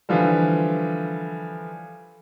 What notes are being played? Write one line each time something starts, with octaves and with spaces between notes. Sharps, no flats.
D3 E3 F3 G3